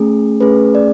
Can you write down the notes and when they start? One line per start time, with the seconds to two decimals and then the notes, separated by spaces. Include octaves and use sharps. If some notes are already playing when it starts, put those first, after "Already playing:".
Already playing: A3 C#4 G#4
0.40 A3 C#4 G#4 B4
0.75 D5